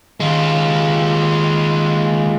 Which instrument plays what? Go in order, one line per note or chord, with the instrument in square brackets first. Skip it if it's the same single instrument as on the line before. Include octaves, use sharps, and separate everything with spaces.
[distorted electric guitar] D#2 [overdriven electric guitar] G#3 F4